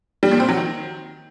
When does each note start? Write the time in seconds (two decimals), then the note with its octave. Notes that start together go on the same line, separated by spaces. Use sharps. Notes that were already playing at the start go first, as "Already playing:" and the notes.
0.23 G3
0.31 A#2
0.40 C4
0.49 F#3
0.57 D#3